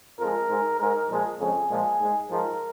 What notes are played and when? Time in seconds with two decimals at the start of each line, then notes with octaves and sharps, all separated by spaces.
0.19 F2 F3 G#3 A#4
0.49 G#2 G#3
0.80 G#2 G#3 A#4
1.09 A#2 F3 G#3
1.39 F2 C#3 G#3 G#4
1.70 A#2 F3 G#3
2.00 G#2 G#3
2.30 G#2 F3 G#3 A#4